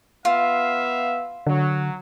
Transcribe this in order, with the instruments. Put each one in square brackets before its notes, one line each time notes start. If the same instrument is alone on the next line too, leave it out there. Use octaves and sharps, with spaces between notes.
[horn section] B3 E5 F5 [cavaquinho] F4
[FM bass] D3 [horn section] F#3